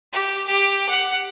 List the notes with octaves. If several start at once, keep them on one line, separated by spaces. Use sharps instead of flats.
G4
G4
F#5